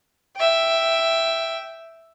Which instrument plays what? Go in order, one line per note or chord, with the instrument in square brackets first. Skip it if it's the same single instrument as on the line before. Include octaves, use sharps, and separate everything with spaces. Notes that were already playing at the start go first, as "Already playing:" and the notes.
[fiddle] E5 G5